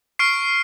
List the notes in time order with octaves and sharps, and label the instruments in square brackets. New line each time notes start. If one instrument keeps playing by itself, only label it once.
[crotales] C#6 F6 C7 D7